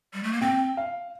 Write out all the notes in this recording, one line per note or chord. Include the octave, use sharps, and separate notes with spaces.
G3
A3
A#3
C4 G5
F5